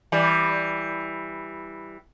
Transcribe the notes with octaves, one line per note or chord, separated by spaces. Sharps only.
E3 G3